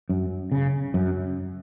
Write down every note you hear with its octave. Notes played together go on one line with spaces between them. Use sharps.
F#2
C#3
F#2